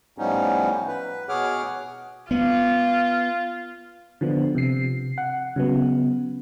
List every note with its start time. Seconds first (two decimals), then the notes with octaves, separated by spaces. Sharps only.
0.18 A2 F3 G3 B3 C#4 D#4
0.87 B4
1.29 B2 G#4 C#5 F#5 D6 F6
2.31 B3 F4
4.21 D3 F3 B3
4.55 C3 C7
5.18 F#5
5.56 C#3 F#3 B3